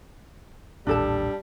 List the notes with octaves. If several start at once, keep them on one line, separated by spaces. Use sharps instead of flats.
A1 D#2 A#2 G3 D4 A4 A5